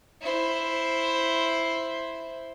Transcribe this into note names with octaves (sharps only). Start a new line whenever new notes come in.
E4 C5